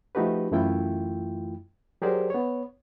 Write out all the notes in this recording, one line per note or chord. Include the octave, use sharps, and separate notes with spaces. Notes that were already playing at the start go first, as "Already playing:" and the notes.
F3 A3 D#4 F#4 G4 B4
F#2 E3 A3 E4 F4 G5
F#3 G4 G#4 A#4 C5 D5
B3 C#5